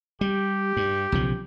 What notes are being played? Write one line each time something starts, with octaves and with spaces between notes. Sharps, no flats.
G3 G4
G2
B1 C#3 F3